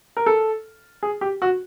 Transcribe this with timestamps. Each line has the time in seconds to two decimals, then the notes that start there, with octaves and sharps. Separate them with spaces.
0.17 A#4
0.26 A4
1.03 G#4
1.21 G4
1.42 F#4